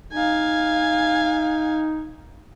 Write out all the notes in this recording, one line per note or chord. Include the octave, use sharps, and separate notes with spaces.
D#4 F5 G#5